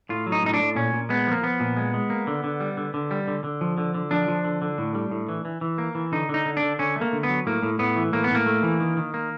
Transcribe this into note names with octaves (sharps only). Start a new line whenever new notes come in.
A2 F4
F#3
D#4
A2 D#4
D4
A2
A#2 C#4
A#2
G#3 B3
F3 A#3
F3 B3
A#2
G#3
G#3
A#3
D3
D3
G3
D3
D3
G3
D3
D3
F3
D3
D3
F3 D4
F3
D3
D3
A2
G3
A2
E3
E3
E3
A#3
E3
D3 D#4
D3 D#4
D3
D4
D3
D3 C#4
A3
A#3
D3
B3
F#3
A2 A#3
A2
A2 B3
E3
A2 A#3
B3
A2 A#3
A3
E3
D#3
D#3
A#3